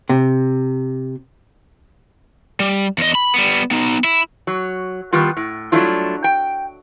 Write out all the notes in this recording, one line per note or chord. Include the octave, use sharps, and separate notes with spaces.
C3
G3
E2 D#5
B5
G3 B3
B3 D#4
E4
F#3
D#3 G3 B3 F4
A2
F#3 G3 A3 D4 E4 F4
G5